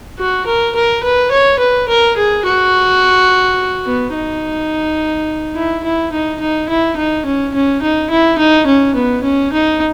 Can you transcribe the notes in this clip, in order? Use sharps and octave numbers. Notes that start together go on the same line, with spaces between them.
F#4
A#4
A#4
B4
C#5
B4
A#4
G#4
F#4
B3
D#4
E4
E4
D#4
D#4
E4
D#4
C#4
C#4
D#4
E4
D#4
C#4
B3
C#4
D#4